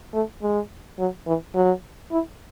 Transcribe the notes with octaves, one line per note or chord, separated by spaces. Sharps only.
A3
G#3
F#3
E3
F#3
E4